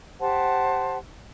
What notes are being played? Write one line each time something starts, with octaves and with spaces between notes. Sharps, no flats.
G4 C5 F#5 A5